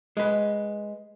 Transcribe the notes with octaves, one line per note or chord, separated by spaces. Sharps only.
G#3 B4